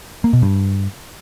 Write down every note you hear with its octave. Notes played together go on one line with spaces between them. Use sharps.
A#3
B2
G2